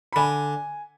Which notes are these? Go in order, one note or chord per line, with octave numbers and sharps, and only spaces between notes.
B5
D3 G#5